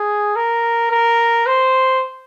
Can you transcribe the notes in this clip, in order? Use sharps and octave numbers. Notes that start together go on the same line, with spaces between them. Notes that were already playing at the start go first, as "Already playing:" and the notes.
Already playing: G#4
A#4
A#4
C5